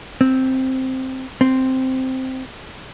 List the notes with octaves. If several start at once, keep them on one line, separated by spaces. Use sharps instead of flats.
C4
C4